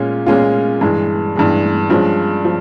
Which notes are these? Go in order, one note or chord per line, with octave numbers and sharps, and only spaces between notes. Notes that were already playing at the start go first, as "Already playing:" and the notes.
Already playing: A#2 G#3 C#4 F4
A#2 G#3 C#4 F4
G2 E3 G#3
G2 E3 G#3
G2 F3 G#3 C#4
F3